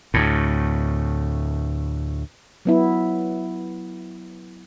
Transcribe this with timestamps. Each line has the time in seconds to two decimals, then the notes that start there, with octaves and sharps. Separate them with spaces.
0.14 D2 A2
2.65 F#3 B3 E4